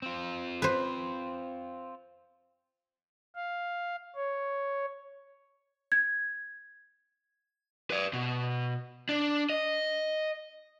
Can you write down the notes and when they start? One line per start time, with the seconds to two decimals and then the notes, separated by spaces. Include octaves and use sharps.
0.02 C4 F4
0.62 B4 C5
3.35 F5
4.16 C#5
5.92 G#6
7.90 B4 D5
8.13 B2
9.09 D4
9.50 D#5